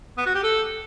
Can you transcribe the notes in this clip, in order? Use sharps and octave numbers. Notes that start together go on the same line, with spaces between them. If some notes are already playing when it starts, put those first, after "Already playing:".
B3
F#4
G4
A4